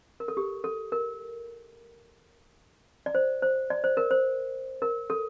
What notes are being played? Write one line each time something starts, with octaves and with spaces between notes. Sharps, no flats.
A#4
A4
G4
A4
A#4
D5
C5
C5
D5
C5
A#4
C5
A#4
A4